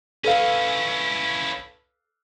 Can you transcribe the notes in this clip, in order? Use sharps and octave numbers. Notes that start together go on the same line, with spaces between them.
C#4 E4 A4 B4 F5